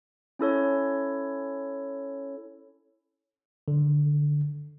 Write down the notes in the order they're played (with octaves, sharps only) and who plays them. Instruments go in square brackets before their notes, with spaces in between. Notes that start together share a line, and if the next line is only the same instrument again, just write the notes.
[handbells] C#4 E4 A4 C#5
[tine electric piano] D3